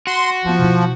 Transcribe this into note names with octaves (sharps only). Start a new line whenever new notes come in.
F#4 C6
F3 B3 F4
B2 E4